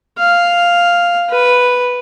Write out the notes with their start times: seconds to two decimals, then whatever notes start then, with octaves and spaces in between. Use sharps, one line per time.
0.18 F5
1.30 B4